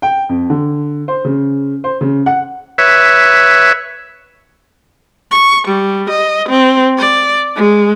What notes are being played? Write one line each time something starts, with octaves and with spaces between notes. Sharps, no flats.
G5
F2
D3
C5
C#3
C5
C#3
F#5
B4 C#5 E5
C#6
G3
D#5
C4
D5
G#3